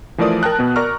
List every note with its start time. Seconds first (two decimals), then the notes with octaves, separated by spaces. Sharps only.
0.18 E3 F3 A3 A#4 D5 D#6
0.43 A#4 G5 A5 F#6
0.59 B2 B3
0.76 A#4 D5 A#5 C#6 F6